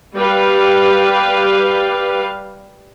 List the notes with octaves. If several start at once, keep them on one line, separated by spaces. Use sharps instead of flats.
G3 G4 B4 F5